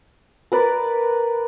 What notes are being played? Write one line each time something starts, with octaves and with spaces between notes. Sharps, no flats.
A#4 B4 D5